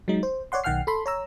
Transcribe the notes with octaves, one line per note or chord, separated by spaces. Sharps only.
F#3 G#3 D#4
C5
C#5 D5 F#5 C6
B1 D#3 F#5 G5 F6 C7
A4 B5 C6
C#5 A#5 E6